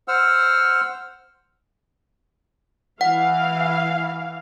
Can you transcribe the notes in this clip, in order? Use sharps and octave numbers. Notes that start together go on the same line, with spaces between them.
C5 F#5 E6 F6
E3 F5 F#5